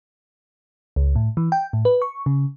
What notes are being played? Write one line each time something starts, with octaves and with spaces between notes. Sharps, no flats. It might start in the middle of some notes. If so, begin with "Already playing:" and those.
C#2
A2
E3
G5
A2
B4
C#6
C#3